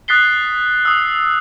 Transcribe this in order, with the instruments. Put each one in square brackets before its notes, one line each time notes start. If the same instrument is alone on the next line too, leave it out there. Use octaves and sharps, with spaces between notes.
[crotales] D#6 F#6 A6 B6 C7 G7
D#6 E6